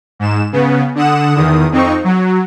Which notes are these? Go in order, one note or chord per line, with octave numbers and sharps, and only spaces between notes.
G#2 E7
C#3 B3
D3 F#5 D#6 E7
E2 D#3 D#6
F2 C4 D#4 C#6
F#3